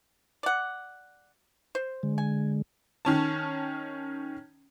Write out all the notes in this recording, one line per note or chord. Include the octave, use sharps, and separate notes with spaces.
D5 F#5
C5
D3 G#3
G#5
D#3 C#4 A5